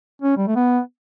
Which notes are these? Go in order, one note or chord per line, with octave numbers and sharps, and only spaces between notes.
C#4
G3
A3
B3